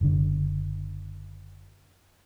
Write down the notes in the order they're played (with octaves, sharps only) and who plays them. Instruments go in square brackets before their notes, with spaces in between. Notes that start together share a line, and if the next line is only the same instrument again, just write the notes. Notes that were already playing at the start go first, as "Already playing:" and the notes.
[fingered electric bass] F#1 D3